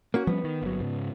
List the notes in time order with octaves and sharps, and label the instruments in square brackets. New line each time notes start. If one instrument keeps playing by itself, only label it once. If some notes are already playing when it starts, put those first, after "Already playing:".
[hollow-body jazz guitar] A#3 C#4 F#4
[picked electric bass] F3 G3 C#4 [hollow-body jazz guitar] B3
[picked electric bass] D#3
G1 F#3
G#2 C#3